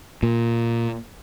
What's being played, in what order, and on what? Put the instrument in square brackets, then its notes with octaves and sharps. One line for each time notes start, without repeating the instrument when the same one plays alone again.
[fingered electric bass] A#2